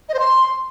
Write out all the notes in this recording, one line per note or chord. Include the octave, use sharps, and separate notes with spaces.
D#5
C5
C6